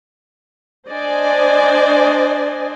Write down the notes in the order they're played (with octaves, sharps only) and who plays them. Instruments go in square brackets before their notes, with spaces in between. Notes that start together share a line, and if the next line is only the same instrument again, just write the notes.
[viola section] D4 C5 D5 D#5 G#5